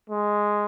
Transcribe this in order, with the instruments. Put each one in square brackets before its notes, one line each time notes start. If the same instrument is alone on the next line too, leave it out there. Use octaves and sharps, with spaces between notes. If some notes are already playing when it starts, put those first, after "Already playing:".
[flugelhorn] G#3